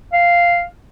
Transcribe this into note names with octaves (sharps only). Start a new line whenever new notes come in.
F5